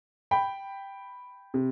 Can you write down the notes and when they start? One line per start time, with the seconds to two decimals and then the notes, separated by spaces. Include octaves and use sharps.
0.31 G5 B5
1.54 C3